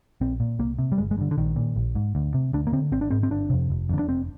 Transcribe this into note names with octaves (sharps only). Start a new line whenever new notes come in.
A#1 C4
A#2
C2 A#3
C3
G3
G1 G#3
G#3
G2 D3
D3
A#1 D#3
A#2
A#1
G#2
D2
C3
D2 D4
A#3
D3 C4
G#1 C4
D4
G#2 C4
C4
G1 D4
F2 C3
F1
F2 D3
D4
F1 C4